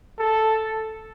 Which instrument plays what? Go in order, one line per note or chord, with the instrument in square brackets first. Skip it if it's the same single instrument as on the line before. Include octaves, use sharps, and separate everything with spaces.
[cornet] A4